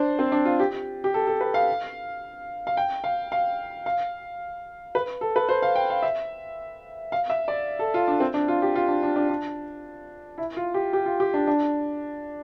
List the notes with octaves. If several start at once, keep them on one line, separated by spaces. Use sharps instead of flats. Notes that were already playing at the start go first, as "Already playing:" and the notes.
Already playing: D4 C5 D5
C4
D4
F4
G4
G4
A4
A4
B4
F5
F5
G5
F5
F5
F5
B4
A4
B4
C5
F5
G5
F5
E5
F5
E5
D5
A4
F4
D4
C4
D4
F4
G4
F4
D4
D4
D4
D4
E4
F4
G4
G4
F4
G4
D4
D4